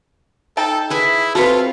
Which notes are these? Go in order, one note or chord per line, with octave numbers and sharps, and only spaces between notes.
D#4 A4 G5 A5
E4 G#4 B4 E5
C4 F4 F#4 A4 B4